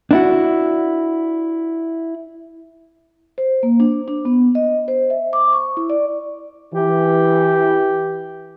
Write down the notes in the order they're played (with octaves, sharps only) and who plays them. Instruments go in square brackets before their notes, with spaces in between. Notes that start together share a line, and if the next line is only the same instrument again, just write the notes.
[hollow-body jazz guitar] D4 E4 F#4
[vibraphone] C5
A#3
D4
D4
B3
D#5
C5
E5
D6
C#6
E4
D5
[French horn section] E3 [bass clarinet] G4